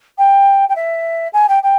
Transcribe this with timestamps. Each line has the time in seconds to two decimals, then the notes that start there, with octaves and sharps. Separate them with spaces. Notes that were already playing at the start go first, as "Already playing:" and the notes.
0.18 G5
0.69 G5
0.76 E5
1.33 G#5
1.49 G5
1.63 G5